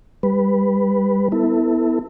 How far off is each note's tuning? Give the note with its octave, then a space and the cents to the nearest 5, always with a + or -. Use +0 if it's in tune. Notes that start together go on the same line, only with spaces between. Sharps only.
G3 +20 B4 +0
B3 +15 E4 -10 A4 +30